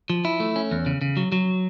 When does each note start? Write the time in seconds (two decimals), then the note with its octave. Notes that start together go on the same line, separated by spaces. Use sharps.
0.10 F3
0.25 E4
0.40 A3
0.56 C#4
0.71 E2
0.86 C#3
1.02 C#3
1.17 F#3
1.32 F#3